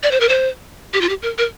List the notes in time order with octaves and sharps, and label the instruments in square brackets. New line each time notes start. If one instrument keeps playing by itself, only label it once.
[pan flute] D5
C5
A#4
C5
G4
F4
G4
A#4
A#4